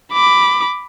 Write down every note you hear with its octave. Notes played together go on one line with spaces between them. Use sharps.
B5 D6